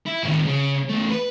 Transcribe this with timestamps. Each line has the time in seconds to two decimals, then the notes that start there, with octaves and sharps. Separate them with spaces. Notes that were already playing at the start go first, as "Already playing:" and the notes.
0.06 E4
0.23 A2 D#3
0.46 C#3
0.89 E2 A3
1.11 B4